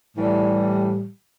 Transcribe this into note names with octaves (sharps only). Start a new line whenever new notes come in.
A2 E3 G3